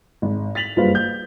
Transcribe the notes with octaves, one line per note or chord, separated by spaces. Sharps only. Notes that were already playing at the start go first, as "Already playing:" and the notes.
G#1
A6 B6 F7 F#7
F#1 G2 F4 B4 C5 F5
G6